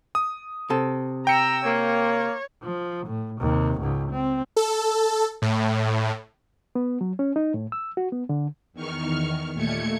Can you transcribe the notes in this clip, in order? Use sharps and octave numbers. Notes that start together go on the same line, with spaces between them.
D#6
C3 A4
G5 A#5 E6 C#7
A#3 C#5
F3
A2
D#2 C3
C#2 G#2
C4
A4
A2
B3
F#3
C#4
D#4
A2
E6
F#4
B3
D3
E2 D#3 C#6 F6
D#2 A#2 A3 G#6 C#7